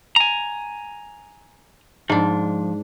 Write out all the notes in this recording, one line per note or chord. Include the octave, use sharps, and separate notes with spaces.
G#5 A#5
G#2 F3 D4